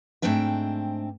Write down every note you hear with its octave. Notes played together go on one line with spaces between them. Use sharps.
G#2 G#3 A3 C4 D4 G5